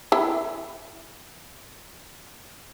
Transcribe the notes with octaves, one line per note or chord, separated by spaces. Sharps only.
E4 E5